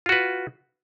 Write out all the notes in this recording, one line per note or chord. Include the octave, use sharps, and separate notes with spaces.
F4 F#4 B4